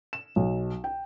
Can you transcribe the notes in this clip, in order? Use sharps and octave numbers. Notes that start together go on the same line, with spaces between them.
E7
B1
G5